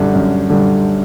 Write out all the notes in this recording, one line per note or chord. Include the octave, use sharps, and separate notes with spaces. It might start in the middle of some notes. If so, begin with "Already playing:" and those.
Already playing: F#2 D3 G3
F#2
D3 G3